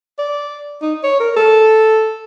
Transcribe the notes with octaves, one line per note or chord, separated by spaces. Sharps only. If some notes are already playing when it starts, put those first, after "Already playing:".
D5
D#4
C#5
A#4
A4